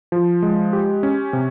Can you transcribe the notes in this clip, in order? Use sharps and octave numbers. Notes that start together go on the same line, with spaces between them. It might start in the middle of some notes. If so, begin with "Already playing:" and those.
F3
G#3
G4
C#4
C3